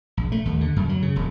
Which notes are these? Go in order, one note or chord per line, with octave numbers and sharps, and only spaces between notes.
A#1
A3
D#2
D3
F#2
F#3
C#3
E1